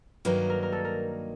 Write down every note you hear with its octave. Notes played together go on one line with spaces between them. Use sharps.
G2 D#3 F#3 A#3 D#4 B4
A#4
A#4
A4
A#4